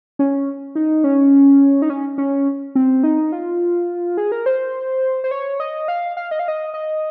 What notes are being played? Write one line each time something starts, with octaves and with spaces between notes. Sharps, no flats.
C#4
D#4
C#4
D#4
C#4
C#4
C4
D#4
F4
G#4
A#4
C5
C5
C#5
D#5
F5
F5
D#5
F5
D#5
D#5